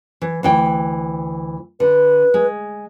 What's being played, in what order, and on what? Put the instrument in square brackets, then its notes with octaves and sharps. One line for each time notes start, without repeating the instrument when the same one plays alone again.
[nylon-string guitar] E3
D2 E3 G5
[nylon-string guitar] D3 [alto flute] B4
[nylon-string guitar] G#3